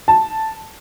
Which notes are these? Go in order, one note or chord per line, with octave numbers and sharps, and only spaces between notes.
A5